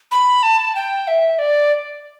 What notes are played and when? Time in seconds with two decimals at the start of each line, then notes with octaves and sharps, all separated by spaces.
0.11 B5
0.43 A5
0.75 G5
1.08 E5
1.39 D5